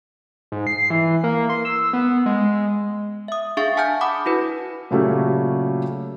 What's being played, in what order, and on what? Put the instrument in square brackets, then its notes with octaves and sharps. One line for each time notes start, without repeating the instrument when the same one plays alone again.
[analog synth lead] G#2
C7
E3
A#3
C6
E6
B3
G#3
G#3
[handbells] E5 D#6
D4 G#4 E5 F5 C#6 A6
F#5 G#5 A5 F6 G6
F#5 B5 D6 D#6
E4 F#4 B4
[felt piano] A#2 C#3 F#3 A3 F4 G4